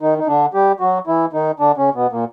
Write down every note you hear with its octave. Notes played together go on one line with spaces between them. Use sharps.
D#3 D#4
D#4
D3 D4
G3 G4
F#3 F#4
E3 E4
D#3 D#4
D3 D4
C#3 C#4
B2 B3
A#2 A#3